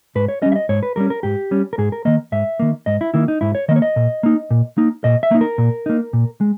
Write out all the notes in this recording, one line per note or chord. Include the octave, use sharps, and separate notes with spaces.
G#2 B4
C#5
G3 C#4 D#5
E5
D#5
G#2 C#5
B4
G3 C#4 A#4
A#4
G#2 G4
G3 C#4
A#4
G#2 G#4
A#4
D#3 A#3 D#5
G#2 E5
D#3 A#3
G#2 D#5
E4
D#3 A#3 E4
D#4
G#2 E4
C#5
D#3 A#3 D#5
C#5
D#5
A#2
A#3 D#4
A#2
A#3 D#4
A#2 D#5
E5
A#3 D#4
A#4
A#2
A#3 D#4
A#2
G#3